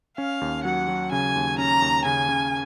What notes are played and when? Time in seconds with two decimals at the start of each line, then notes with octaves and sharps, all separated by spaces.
0.18 C#4 F5
0.41 D#2
0.64 F#3 F#5
0.88 F#3
1.12 C#3 G#5
1.35 D#2
1.58 C#4 A#5
1.82 D#2
2.05 C#3 G#5
2.29 C#3